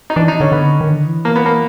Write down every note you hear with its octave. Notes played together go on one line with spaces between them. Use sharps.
D#4
E3 D4
D#4
D3 C#4
D3 B3
D#3
D3
E3
A#3
B3
A#3